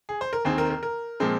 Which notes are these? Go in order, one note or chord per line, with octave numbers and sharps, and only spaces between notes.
G#4
C5
A#4
D#2 D#3 C4 G#4
A#4
A#4
A#4
A#2 F3 G#3 C4